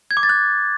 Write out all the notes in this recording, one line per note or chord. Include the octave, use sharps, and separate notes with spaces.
G#6
D6
A6
F#6